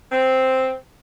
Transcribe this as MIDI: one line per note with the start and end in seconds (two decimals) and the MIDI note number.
0.11 0.72 60